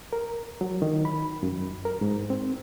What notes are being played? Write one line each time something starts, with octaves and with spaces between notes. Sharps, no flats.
A#4
F#3
D#3
B5
F#2
A#4
G#2
C4